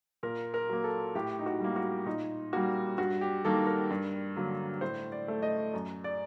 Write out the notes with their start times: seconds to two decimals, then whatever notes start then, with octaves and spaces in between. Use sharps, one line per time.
0.23 A#2 A#4
0.54 A#4
0.69 F#3 A#3
0.84 A4
1.15 A2 G4
1.39 D#4
1.46 F#4
1.60 G3 A#3
1.76 F#4
2.06 A#2 D#4
2.53 G3 A#3 F#4
2.98 G2 F#4
3.21 G4
3.44 D#3 G3 A#3 A4
3.67 A#4
3.90 G2
4.36 D3 F#3 A#3
4.81 A2 C5
5.12 D5
5.28 A3
5.42 D#5
5.74 F#2
6.04 D5